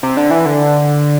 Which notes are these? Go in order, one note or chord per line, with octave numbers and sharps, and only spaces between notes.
C3
D3
E3
D3